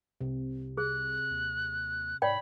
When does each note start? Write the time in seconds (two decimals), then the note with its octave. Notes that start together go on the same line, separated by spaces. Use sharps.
0.21 C2 C3
0.77 G#4 F#6
1.31 D#2
2.22 G#2 C#5 D5 G5 B5